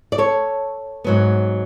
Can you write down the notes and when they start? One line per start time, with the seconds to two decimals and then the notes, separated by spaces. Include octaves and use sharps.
0.12 D5
0.18 A4 C#5
1.04 G#2 F#3 B3